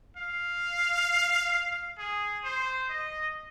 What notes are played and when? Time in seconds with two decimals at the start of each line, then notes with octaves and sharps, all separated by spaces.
0.17 F5
1.98 G#4
2.44 C5
2.89 D#5